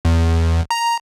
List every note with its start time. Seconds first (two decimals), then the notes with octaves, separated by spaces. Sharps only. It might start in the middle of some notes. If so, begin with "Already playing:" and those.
0.05 E2
0.71 A#5